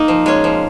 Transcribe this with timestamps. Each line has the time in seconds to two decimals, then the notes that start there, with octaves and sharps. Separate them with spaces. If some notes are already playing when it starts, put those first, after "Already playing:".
Already playing: A#3 D#4
0.08 F3
0.26 G#3 C#4
0.44 F3